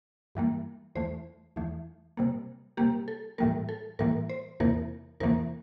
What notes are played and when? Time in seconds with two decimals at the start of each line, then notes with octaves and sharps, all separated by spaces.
0.35 G2 E3 G3 A#3
0.95 E2 E3 A3 C5
1.56 E2 E3 A3
2.17 C3 G3 A#3
2.77 C3 G3 A#3 G4
3.08 A4
3.38 A2 E3 G3 A#3 A#4
3.69 A4
3.99 A2 E3 G3 A#3 A#4
4.29 C5
4.60 E2 C3 E3 A#3 A#4
5.20 E2 C3 E3 A#3 A#4